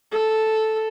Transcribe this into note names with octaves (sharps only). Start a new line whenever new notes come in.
A4